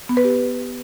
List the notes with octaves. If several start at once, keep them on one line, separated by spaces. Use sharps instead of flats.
B3
B4
G4